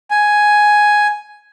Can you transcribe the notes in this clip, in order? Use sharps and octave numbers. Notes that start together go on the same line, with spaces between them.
G#5